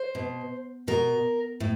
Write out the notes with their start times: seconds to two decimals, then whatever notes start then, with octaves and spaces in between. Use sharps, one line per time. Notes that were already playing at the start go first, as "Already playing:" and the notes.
Already playing: C5
0.15 B2
0.87 B2 A#4
1.60 A2